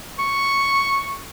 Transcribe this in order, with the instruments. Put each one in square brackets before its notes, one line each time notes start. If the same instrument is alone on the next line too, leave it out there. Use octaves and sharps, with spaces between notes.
[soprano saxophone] C#6